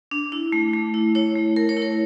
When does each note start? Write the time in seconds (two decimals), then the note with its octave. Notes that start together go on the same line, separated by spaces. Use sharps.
0.11 D4
0.32 E4
0.52 A3
0.73 A3
0.94 E4
1.15 E4 C#5
1.35 A3
1.56 A3 A#4
1.69 C#5
1.77 E4
1.82 A#4